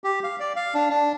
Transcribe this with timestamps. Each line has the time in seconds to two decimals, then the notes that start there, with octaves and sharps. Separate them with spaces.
0.04 G4
0.24 F5
0.40 D5
0.56 F5
0.74 D4
0.90 D4